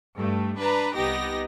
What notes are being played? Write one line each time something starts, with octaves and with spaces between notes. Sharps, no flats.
G2 A3
D4 B4 A#5
C2 B3 D#4 G4 A#6